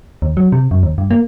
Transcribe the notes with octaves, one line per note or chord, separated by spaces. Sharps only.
D#2
F#3
C3
F#2
D#2
G2
A#3